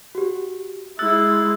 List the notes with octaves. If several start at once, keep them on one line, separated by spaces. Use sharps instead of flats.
F#4 G4
G#3 E4 E6 F#6 A6